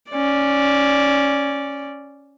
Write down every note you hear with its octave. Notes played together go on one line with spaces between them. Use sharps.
C#4 D5